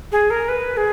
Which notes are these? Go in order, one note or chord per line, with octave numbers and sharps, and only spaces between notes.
G#4
A#4
B4
G#4